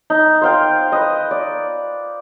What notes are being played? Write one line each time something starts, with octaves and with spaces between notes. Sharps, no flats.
D#4
C5 F5 G5
B4 D#5
D5